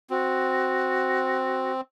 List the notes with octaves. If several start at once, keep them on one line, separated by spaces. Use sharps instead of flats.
C4 F#4